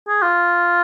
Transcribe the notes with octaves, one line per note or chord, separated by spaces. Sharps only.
G#4
F4